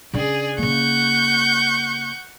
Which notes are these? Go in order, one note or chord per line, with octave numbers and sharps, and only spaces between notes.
C#3 D4 G#4 D5
C#3 A#3 F#5 C#6 G6